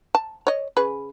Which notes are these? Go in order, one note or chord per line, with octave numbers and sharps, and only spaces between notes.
A5
C#5 D#5
C#3 G#4 B4